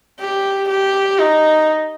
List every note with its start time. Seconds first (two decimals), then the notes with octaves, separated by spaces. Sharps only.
0.20 G4
0.69 G4
1.19 D#4